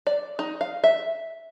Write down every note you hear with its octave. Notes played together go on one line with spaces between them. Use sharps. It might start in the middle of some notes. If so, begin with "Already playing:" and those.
D5
D#4
F5
E5